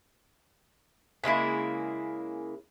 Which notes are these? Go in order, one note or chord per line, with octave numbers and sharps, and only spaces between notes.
C#3 G#3 A#3 E4